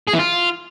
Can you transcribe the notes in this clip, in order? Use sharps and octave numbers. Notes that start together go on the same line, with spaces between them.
G#4
E3
F4